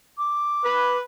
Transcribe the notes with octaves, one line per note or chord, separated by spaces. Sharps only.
D6
B4